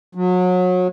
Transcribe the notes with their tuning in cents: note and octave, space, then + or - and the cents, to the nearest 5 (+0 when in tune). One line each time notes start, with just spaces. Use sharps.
F#3 -30